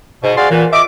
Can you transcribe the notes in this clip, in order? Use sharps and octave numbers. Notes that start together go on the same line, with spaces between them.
G#2 B2
F#4 G#4 D5 F5 C6
A#2 E3
D#5 E5 D6